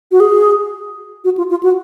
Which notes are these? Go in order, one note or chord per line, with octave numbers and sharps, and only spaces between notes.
F#4
G#4
F#4
F4
F4
F#4